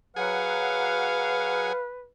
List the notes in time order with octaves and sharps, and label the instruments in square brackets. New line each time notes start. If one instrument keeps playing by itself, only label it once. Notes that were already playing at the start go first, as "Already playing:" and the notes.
[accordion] F#3 F#5 [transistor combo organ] G#4 [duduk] B4 [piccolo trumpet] F5